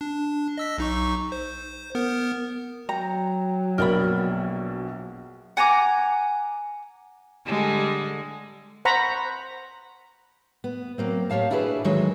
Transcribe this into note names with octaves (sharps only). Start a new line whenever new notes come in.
D4
D#5 E6 B6
B1 D#4 C#6
C5
B3 A#4
F#3 G5 A#5
A#1 B2 A#4 D5 B5
F#5 G#5 A#5 D6
D3 G3 G#3
C5 F#5 A#5 B5 C#6
B3
F#3 A#3 C4
A#2 G4 C#5 F5 A5
D4 E4 F#4 G#4 A#4 B4
D3 D#3 F#3 G#3 C#5